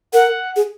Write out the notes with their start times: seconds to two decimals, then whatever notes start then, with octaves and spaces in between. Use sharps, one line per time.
0.13 A#4 F#5
0.56 G#4